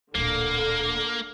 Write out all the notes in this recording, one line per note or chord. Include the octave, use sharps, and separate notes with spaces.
D1 A#1 D3 A#3